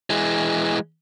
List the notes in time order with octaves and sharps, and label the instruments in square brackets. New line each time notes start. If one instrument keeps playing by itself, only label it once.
[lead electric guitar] E3 G#3